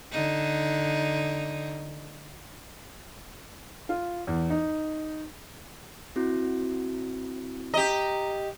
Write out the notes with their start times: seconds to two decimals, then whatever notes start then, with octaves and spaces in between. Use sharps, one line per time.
0.12 D3 D#4
3.89 F4
4.27 E2
4.50 D#4
6.16 C4 E4 F#4
7.74 G4 D#5 A#5